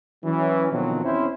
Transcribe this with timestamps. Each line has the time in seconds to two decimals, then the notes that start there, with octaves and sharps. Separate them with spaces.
0.24 E3 F#3 C#4
0.72 B2 D3 D#3 F3 F#3 C4
1.04 E2 C4 C#4 E4 C5